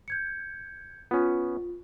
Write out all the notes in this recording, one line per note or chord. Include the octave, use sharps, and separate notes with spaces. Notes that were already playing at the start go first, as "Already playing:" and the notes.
G6 G#6 C#7
B3 C#4 F4